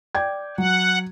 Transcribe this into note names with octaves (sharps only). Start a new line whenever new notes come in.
D5 G5 G#6
F#3 F#5